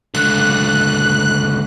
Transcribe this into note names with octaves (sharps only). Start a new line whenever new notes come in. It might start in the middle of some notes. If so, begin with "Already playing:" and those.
C#2 D3 F#6